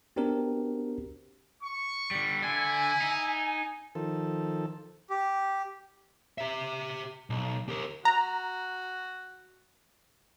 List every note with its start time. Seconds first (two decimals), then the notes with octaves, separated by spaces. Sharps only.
0.16 B3 C4 D4 F#4 G4 A#4
1.62 C#6
2.11 D3 G3
2.43 D3 E4 G#5
3.02 D#4
3.95 D#3 F3 A4
5.10 G4
6.38 G4 E5
7.30 B1
7.69 G4 A#4
8.05 F#4 A#5